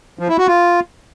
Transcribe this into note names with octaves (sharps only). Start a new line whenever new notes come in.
F3
E4
F#4
F4